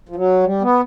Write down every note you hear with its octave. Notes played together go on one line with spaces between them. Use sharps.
F3
F#3
G3
B3